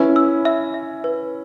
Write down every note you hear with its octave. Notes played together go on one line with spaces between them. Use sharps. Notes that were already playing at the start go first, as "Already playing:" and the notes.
Already playing: C#4 E4 B4
E6
E5
E5
B4